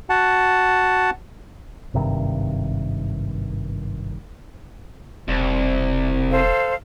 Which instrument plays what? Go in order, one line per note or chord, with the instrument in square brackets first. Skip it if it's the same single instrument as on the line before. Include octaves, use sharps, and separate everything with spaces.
[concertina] F#4 F#5 A5
[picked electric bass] G#1 G2 C3 D#3
[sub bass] E1 [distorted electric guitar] C2
[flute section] A4 C5 F5